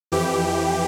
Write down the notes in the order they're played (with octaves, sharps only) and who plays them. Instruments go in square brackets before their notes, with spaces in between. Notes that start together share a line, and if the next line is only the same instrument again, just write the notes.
[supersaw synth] F2 E3 G4